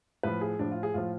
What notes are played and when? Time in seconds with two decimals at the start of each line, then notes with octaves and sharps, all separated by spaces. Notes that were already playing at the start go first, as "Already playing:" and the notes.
0.23 A2 F3 B4
0.41 G#4
0.59 A2 F3 D4
0.71 F4
0.83 G#4
0.94 A2 F3 F4